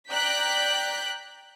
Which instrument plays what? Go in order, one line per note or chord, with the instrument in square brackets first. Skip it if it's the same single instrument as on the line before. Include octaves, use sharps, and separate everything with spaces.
[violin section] D5 G5 A#5 F#6 G6 B6